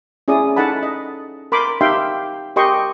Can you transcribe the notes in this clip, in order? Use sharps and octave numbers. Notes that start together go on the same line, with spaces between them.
C#4 E4 G#4 D5 D#6
D#4 A4 F#5 A5 B5
D#5
A#4 B5 C6 D6
D#4 G4 E5 F5 G5 C6
G4 A#4 D#5 G5 C6 C#6